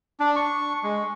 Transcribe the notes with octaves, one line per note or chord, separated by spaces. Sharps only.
D4
C#6
G#3